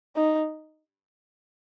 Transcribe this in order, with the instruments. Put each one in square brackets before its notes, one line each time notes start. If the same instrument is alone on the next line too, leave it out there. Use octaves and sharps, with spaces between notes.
[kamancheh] D#4